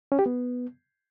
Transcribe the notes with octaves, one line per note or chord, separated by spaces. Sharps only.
C#4
G4
B3